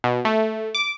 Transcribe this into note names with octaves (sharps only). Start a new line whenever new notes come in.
B2
A3
D6